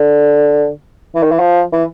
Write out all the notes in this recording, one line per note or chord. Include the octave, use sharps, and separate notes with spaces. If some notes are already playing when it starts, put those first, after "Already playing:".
Already playing: D3
E3
D#3
E3
F3
E3